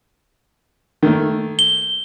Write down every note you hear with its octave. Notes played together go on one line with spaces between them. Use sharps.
D#3 A3 A#3
G7